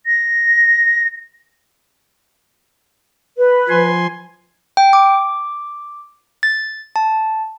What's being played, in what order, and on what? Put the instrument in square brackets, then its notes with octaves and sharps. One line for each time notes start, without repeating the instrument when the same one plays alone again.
[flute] A#6
[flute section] B4
[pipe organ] F3 G#5 C6
[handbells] G5
D6
A6
A5